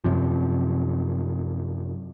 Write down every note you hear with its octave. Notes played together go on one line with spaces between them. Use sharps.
F#2 C3 F3